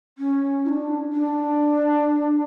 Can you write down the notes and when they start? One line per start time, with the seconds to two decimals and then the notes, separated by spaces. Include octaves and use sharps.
0.18 C#4
0.65 E4
0.69 D4
1.13 D4